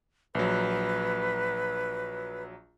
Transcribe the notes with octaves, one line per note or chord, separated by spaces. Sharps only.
A#1 F#3 B4